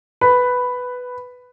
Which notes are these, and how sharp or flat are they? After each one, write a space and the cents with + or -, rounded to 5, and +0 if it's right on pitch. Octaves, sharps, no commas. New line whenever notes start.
B4 +5